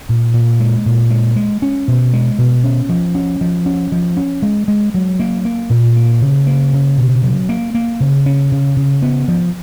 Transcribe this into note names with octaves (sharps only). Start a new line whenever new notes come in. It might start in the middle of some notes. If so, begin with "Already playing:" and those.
A#2
A#2
G#3
A#2
G#3
G#3
C#4
B2
G#3
B2
C#4
F3
C#4
F3
C#4
F3
C#4
G#3
G#3
F#3
A#3
A#3
A#2
A#3
C#3
A#3
C#3
B2
F#3
A#3
A#3
C#3
C#4
C#3
C#3
B3
F3